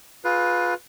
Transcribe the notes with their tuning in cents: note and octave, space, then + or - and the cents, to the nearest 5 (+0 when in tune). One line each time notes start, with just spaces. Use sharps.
F4 +20 G#4 +25 B4 +0